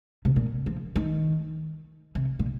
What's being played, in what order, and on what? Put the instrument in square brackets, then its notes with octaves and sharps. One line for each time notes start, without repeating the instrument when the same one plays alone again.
[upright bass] C3
A#2
F3
D#3
C3
A#2